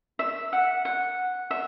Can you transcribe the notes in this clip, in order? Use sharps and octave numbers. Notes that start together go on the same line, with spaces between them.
E5
F#5
F#5
E5